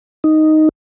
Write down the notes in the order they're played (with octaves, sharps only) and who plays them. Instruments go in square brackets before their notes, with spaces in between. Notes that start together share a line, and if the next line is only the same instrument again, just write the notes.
[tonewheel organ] D#4